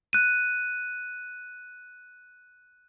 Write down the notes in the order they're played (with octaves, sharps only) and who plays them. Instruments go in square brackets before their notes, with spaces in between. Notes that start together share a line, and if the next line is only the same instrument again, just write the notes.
[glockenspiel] F#6 D#7